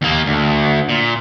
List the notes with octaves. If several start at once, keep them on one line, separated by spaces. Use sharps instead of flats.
D#2 A#3
D2
A#2